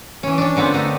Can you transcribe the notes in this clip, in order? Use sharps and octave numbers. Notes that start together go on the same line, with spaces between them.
E3 C#4
C#4 D4
A#2 D3 B3 C4
D3 A3 D#4